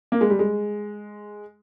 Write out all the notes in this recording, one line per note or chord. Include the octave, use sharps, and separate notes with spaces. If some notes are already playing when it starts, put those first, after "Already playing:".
A#3
G#3
G3
G#3